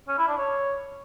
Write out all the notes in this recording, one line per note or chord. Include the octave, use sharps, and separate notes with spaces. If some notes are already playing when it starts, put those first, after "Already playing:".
C#4
E4
D4
C#5